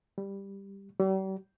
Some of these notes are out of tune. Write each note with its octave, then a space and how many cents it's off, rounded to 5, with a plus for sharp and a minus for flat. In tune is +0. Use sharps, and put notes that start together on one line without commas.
G3 +10
G3 -40